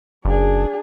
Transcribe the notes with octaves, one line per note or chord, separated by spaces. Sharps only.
F#1 D4 G#4